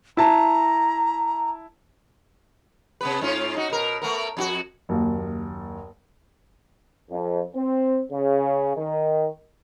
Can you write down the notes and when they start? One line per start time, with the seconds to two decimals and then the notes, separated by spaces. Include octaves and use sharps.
0.17 E4 A5 A#5
3.01 C3 B3 B4
3.21 G#2 C#4 F4
3.56 D#4 F#4
3.70 B2 A#4
4.02 A3 B3 A#4
4.37 F2 F4 F#4
4.89 F#1 D#2
7.10 F2
7.56 C4
8.12 C#3
8.76 D#3